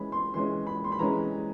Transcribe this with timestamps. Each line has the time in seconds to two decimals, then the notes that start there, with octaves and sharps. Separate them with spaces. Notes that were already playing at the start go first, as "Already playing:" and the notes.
Already playing: E3 G#3 C#4 B5
0.12 C6
0.34 E3 G#3 C#4 C6
0.67 B5
0.84 C6
0.92 B5
0.99 E3 G#3 C#4 A#5